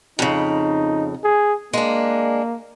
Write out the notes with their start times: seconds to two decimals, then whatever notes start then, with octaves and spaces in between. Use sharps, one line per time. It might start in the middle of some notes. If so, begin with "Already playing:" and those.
0.19 F2 C#3 D#4
1.24 G#4
1.73 G#3 A#3 D4